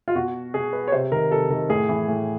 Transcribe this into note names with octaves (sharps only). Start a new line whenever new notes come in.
F4
B2 F#4
B2 G#4
B4
C#5
C3 C5
D#3 A#4
C3 A4
D#3 A#4
A2 G#4
E3
A2